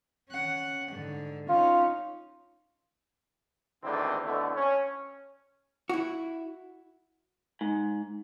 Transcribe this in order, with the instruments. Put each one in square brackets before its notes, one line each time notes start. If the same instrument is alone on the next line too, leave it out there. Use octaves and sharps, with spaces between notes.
[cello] C#4 F#5
G#2 D3
[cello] C#4 D#4 [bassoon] F4
[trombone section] G#1 E2 A2 D3 C4
B2 D3 A3 C4 E4
C#4
[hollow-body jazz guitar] E4 F#4
[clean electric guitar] G#2